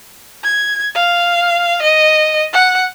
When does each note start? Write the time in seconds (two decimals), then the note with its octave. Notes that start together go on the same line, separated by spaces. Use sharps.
0.44 G#6
0.95 F5
1.82 D#5
2.53 F#5